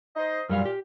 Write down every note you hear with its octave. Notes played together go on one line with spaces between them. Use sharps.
D#4 C5 D#5
F#2 A#2 G3 F5 F6
G4